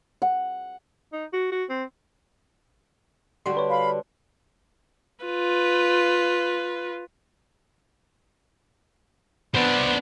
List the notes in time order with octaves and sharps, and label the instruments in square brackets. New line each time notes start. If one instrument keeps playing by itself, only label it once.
[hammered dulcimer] F#5
[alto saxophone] D#4
F#4
F#4
C4
[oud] D3 G3 F#4 [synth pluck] C6
[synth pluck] B4 C#5
[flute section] F5 B5
[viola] F4 B4
[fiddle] B3 [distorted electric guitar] D4 C5